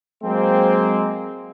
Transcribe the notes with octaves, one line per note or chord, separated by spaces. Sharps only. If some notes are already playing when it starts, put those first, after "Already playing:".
F#3 G#3 A#3 C4